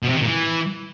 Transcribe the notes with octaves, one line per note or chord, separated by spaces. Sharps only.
B2
C3
D#3
A#2
E3